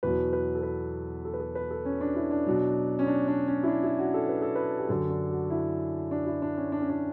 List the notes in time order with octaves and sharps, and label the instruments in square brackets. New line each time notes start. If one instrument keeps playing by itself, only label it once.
[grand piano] E2 B2 F#3 B4
B4
A4
B4
A4
B4
A4
B4
A4
C#4
D4
E4
D4
B2 F#3
C#4
D4
D4
C#4
E4
D4
E4
F#4
A4
B4
A4
B4
G4
F#2 D3 F#3 A4
D4
F#4
E4
D4
E4
D4
C#4
D4
C#4
D4